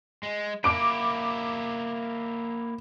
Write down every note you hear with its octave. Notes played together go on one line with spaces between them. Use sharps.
G#3
A#3 E4 D6 D7